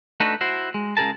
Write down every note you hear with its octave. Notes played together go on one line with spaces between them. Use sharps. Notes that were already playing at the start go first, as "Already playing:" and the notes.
A3 D4 D#4 F#4 A4 B4
E4 F#4 C5
G#3
C#2 C#3 G#4 A#4 A5